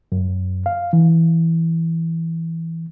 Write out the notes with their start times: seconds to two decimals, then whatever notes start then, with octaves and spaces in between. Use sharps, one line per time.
0.12 F#2
0.66 F5
0.93 E3